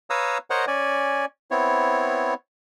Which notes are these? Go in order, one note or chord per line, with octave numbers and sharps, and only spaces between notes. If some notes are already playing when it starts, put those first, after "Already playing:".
B4 C#5 F5 A#5 D#6 E6
A#4 C5 C#5 D#5 F#5 A#5
C#4 D5 G#5
B3 C4 E4 C#5